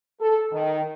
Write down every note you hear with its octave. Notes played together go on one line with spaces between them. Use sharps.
A4
D#3